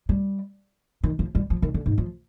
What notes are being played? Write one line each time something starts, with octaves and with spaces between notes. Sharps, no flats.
G3
D#3
F3
G3
F3
D#3
D3
G#2
F3